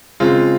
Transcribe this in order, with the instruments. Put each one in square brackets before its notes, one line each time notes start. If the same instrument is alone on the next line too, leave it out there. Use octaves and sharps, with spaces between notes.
[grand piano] C#3 G#3 C4 F4